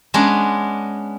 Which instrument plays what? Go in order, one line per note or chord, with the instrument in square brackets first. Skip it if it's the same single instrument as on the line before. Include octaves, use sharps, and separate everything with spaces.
[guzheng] G#3 B3 C#4 D4